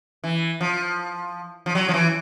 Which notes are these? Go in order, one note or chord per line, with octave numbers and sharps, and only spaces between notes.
E3
F3
F3
F#3
F3
E3